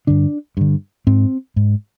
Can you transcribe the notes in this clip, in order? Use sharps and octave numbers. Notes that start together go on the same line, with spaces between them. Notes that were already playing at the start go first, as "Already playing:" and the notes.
G2 D3 D4
G2 D3
G#2 C4
G#2